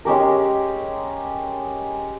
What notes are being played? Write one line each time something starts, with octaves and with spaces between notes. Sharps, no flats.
G#3 C#4 G4 A#4